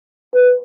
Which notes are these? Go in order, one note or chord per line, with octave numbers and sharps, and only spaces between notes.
B4